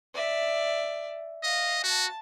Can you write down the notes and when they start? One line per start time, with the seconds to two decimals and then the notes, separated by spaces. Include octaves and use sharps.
0.15 D5 E5
1.43 D#5 F5
1.84 F#4 A5